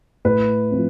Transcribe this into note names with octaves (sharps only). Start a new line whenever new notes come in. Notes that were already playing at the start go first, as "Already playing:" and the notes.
A2 B4
F3 C4